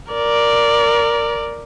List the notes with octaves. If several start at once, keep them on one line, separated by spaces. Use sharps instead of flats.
A#4 D5